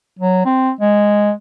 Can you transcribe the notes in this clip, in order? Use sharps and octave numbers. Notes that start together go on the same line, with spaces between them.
F#3
C4
G#3